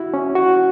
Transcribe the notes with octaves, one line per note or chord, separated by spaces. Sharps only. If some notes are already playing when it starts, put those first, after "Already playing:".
Already playing: E4 F#4
C#4
F#4